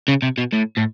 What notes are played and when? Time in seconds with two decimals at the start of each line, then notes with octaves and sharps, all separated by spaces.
0.08 C#3
0.22 C3
0.38 B2
0.52 A2
0.77 A2